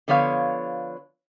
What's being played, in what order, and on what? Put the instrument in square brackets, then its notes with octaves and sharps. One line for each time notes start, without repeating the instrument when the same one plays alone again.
[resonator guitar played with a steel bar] D3 F3 B3 C#5 F5